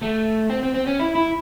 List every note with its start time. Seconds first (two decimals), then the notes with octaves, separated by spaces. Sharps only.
0.02 A3
0.49 C4
0.62 C4
0.74 C4
0.86 C#4
0.99 E4
1.15 E4